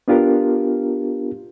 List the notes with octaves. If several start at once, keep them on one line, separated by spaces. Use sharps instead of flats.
B3 D4 F4 G4 A#4